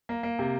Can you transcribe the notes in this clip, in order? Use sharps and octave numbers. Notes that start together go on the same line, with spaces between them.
A#3
A#3
C3